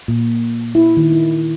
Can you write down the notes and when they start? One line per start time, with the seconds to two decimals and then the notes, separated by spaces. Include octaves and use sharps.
0.08 A#2
0.75 E4
0.97 D#3
1.12 E4